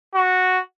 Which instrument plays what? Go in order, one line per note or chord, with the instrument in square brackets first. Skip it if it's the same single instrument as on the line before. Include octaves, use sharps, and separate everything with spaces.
[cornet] F#4